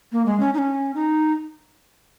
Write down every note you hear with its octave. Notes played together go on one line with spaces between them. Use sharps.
A#3
G#3
C#4
D#4
C#4
D#4